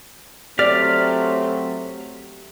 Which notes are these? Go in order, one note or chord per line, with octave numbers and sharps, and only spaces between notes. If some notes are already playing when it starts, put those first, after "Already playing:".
F#3 A3 C4 G4 D5 F6